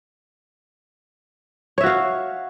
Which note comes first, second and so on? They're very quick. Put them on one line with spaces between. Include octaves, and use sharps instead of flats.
C#5 E5 F#4 F5